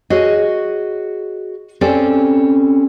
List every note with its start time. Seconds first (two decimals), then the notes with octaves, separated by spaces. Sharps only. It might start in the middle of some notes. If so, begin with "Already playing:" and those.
0.10 F#4 G#4 C#5 D#5
1.81 C4 C#4 G4 A4 D5